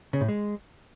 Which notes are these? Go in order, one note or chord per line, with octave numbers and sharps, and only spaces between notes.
C#3
A2
G#3